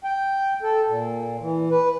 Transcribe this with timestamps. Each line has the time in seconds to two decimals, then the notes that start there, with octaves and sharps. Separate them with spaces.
0.04 G5
0.63 A4
0.88 A#2
1.40 E3
1.71 B4